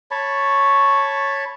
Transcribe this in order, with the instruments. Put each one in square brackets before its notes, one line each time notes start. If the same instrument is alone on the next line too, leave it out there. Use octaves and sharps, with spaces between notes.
[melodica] C#5 A5 B5 C#6